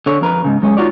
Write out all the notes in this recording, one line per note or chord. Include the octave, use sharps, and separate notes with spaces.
D3 C#5
F2 A#4 B4
G#2 C#3
F#2 G#3 C#4
D#4 F4 F#4 C#5 D5